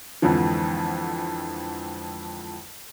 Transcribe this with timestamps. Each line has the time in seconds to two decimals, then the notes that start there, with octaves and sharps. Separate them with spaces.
0.22 F2 G#2 D3 E3 F3